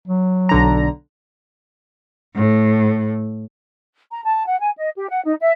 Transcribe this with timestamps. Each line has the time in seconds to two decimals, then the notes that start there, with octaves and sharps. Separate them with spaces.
0.08 F#3
0.49 B1 D3 A#5
2.35 A2
4.12 A#5
4.25 A5
4.47 F#5
4.59 G#5
4.77 D#5
4.97 G4
5.10 F#5
5.25 D#4
5.41 E5